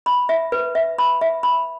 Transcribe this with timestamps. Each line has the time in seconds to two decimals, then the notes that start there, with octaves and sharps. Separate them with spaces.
0.06 B5
0.29 E5
0.52 B4
0.75 E5
0.98 B5
1.21 E5
1.43 B5